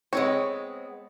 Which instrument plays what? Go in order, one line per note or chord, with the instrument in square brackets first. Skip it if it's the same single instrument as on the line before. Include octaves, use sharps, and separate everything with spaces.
[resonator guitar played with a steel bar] G#3 B3 C4 [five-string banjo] C#5